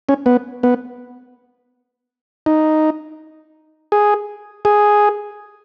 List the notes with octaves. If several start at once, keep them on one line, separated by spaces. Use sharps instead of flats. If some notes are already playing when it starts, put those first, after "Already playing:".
C#4
B3
B3
D#4
G#4
G#4